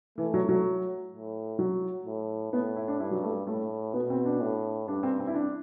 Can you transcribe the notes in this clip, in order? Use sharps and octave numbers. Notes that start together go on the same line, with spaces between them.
E3 A3
F#3
F#3
A2
F#3
A2
A2 B3
E4
D4
G2 E4
F#3
A3
A2 A3
B2 B3
C4
D4
A2
G2 D4
C4
C4
E4
D4